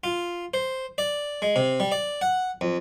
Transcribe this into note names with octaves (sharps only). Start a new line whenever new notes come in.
F4
C5
D5
G#3
C3
G3
D5
F#5
F2